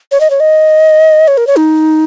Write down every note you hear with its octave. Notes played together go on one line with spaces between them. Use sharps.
C#5
D#5
C#5
D#5
C#5
A#4
C#5
D#4